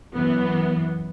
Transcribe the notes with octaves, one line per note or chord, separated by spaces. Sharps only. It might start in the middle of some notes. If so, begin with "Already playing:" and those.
F#2 E3 B3